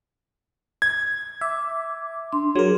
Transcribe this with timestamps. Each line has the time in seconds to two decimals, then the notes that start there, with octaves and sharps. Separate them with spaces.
0.82 G#6
1.41 E5 D6
2.32 D4 C6
2.56 F#3 G#4 A#4